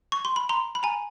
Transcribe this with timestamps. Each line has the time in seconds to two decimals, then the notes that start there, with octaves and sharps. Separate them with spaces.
0.12 C#6
0.25 C6
0.36 B5
0.49 A#5 C6
0.75 B5
0.83 G#5 A#5